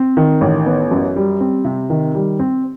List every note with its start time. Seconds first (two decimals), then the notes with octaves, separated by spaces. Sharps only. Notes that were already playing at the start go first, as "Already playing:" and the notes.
Already playing: C4
0.17 D#3
0.41 A1
0.66 B3
0.91 F#2
1.16 G3
1.40 C4
1.65 C3
1.90 D#3
2.15 G3
2.39 C4